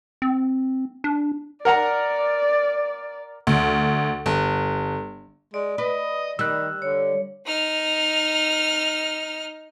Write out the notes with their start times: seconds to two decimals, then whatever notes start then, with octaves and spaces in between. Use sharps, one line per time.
0.22 C4
1.04 D4
1.65 A#4 D5 F#5 A#5
3.47 D2
4.26 G1
5.54 G#3 D5
5.78 B4 D#5
6.39 D#3 G3 E6 F#6
6.82 D3 C#5
7.46 D#4 F6